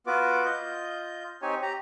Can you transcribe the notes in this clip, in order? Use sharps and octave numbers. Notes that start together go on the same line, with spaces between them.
B3 F4 F#4 B4 D6
F4 D#5 G6
C4 D#4 G4 C#5 G#5
G4 A#5